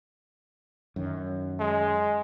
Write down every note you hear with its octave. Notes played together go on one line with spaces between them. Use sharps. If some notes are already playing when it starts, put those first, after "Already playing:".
F#2 D#3
G#3